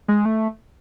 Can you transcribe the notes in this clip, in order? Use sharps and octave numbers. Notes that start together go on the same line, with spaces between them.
G#3
A3